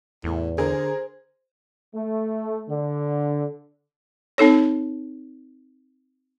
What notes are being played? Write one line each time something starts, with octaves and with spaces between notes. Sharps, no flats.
E2 A2
D3 G#4 A#4 C5
A3
D3
C4 D#4 A4 C#5